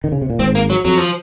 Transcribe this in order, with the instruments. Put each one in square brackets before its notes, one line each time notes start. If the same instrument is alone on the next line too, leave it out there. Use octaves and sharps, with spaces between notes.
[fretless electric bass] D#3
C#3
C3
A#2
[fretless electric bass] G#1 G#2 [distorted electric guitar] C4
[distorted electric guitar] A#3
F#3
[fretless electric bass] F2 [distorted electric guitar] F#3
[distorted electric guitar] F3